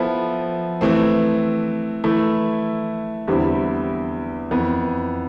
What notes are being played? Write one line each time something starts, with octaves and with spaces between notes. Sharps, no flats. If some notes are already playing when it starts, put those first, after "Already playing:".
Already playing: F3 B3 E4 A4
E3 A3 C4
E3 A3 E4
E2 D3 G3 C4 E4
F2 E3 B3